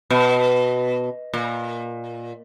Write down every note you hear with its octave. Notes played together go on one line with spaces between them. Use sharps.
B2
A#2